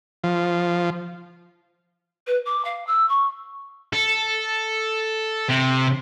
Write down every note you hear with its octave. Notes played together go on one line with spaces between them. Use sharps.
F3
B4
D6
F5
E6
C#6
A4
C3